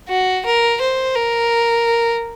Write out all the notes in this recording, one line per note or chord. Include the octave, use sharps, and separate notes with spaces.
F#4
A#4
C5
A#4